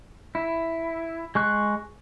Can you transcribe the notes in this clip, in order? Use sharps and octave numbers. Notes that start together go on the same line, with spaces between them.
E4
G#3 C#6 F#6